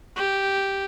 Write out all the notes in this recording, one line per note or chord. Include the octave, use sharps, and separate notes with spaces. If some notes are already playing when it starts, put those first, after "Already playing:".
G4